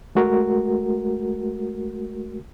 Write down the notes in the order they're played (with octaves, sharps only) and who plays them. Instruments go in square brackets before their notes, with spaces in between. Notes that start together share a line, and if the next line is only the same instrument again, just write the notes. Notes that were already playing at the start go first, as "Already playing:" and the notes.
[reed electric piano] G#3 A3 F#4 A#4